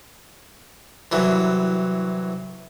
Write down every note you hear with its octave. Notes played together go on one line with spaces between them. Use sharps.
C2 E3 F#3